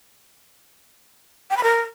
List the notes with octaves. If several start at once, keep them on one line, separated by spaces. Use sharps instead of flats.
G5
B5
A#4